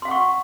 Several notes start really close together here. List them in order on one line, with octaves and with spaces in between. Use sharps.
C6 F5 F#5 C#6